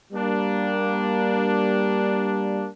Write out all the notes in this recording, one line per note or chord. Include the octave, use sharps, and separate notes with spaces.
G3 A#3 D4